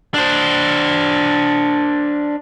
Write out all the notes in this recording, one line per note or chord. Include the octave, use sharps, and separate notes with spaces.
D4 C5